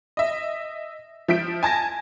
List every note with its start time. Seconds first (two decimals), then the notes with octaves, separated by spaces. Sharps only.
0.17 D#5 E5
1.28 F3 E5 G6 B6 D7
1.63 G#5 A5 G#6 A#6